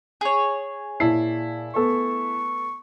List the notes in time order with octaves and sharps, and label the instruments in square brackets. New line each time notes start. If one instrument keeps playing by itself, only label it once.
[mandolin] G#4 C#5
[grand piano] A#2 A5 C7 [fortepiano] E4
[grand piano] A3 B3 A4 [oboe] C#6